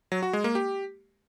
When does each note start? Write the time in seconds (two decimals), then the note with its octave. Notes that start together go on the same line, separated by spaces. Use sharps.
0.12 F#3
0.22 F#4
0.33 G#3
0.44 A#3
0.55 G4